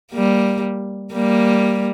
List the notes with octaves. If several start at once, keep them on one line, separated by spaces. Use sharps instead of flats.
G3 A#3
G3 A#3